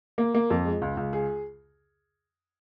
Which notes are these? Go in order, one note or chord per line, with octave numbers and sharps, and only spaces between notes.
A#3
A#3
F2
G#3
C#2
C#2
G#4